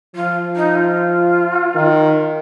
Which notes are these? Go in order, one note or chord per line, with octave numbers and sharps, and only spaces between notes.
F3 F4
D#4
F4
D#3